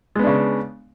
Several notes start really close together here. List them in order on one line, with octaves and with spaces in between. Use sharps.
G#3 B3 D4 C#3